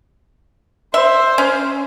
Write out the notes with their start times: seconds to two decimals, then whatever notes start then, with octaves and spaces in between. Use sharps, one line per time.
0.94 C5 E5
1.38 C#4